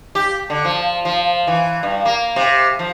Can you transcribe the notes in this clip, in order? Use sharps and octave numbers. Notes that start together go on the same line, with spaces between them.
G4
D3
F3
F3
E3
G2
A#3
C3
F3